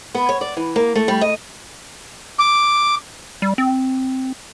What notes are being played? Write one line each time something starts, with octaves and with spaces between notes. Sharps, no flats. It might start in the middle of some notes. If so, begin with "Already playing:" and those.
B3
C#5
D5
E3
A#3
A3
G3
D#5
D6
G3
C4